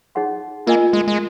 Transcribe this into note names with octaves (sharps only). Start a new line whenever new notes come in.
D#4 G#4 C#5 F#5 C6
A#3 F4 A#4 D#5 G#5
G#3
G#3